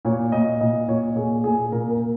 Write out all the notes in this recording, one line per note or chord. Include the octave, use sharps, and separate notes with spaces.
A#2 C#5
A#2 D#5
A#2 D#5
A#2 C#5
A#2 G#4
A#2 G#4
A#2 A#4
A#4
A#2